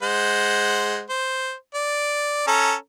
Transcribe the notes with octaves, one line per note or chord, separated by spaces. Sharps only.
G#3 C5 F#5
C5
D5
C#4 A4 A#5